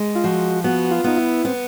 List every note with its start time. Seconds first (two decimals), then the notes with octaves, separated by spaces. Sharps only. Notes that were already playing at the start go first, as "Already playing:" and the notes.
Already playing: G#3
0.15 F4
0.24 F3 F#4
0.64 B3 F#4
0.91 F4
1.04 B3 D#4
1.18 E4
1.44 B3 C4